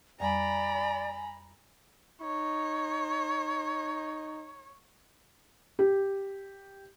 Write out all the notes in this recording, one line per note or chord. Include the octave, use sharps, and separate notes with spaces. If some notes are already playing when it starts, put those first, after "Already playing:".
F2 G3 D5 G#5 A#5 B5
D#4 C#5
G4